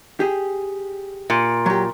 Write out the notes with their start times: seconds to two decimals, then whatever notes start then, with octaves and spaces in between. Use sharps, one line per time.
0.20 G4 G#4
1.30 A#2
1.66 F#3 G4